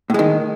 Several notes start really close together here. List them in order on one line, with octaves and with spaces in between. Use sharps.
A2 G#3 D#3